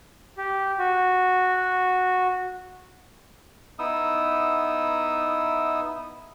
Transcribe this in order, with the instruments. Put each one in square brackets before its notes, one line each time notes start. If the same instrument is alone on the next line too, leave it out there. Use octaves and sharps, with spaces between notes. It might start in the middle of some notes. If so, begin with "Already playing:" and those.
[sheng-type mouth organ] G4
F#4
[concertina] B3 D#4 E4 D#6 E6